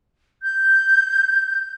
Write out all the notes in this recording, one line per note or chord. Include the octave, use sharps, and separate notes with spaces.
G6